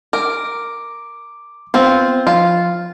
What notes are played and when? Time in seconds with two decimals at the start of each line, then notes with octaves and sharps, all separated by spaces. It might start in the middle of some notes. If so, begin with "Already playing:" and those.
0.13 A#4 D6
1.74 B3 C4 F4 C5
2.27 F3 F4